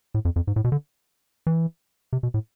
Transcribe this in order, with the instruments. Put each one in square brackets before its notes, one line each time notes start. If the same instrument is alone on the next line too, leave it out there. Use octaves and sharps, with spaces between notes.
[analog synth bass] A2
F2
F2
G#2
A2
B2
D3
E3
C3
B2
A2